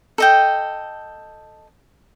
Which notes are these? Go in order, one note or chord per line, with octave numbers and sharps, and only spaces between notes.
A4 D#5 G5